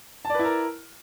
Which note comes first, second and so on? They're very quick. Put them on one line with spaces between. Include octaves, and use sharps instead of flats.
A5 D5 B4 E4 A#4